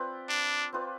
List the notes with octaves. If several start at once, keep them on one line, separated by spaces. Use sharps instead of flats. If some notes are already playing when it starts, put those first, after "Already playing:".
Already playing: C4 F4 B4 D5
D4
C4 F4 B4 D5